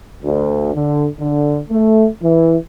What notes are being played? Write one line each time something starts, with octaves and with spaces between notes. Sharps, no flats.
D2
D3
D3
A3
E3